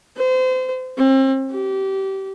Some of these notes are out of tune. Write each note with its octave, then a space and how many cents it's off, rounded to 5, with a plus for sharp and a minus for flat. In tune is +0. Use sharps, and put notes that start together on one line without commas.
C5 -30
C4 +35
G4 -25